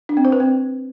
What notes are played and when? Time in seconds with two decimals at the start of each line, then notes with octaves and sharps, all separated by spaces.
0.09 D4
0.17 C4
0.25 C5
0.32 B4
0.40 C4